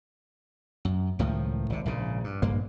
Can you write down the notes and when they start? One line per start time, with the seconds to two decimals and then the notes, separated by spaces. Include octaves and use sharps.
0.85 F#2
1.19 C#2 A2 D#3 F3
1.70 G#1 C3
1.86 A#1 G#2 C#3
2.24 G2
2.42 A#1 G2 A#3